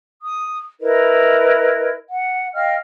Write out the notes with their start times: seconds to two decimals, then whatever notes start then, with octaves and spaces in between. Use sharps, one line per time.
0.21 D#6
0.80 E4 A#4 B4 D#5
2.08 F#5
2.54 D#5 F5 G5 F6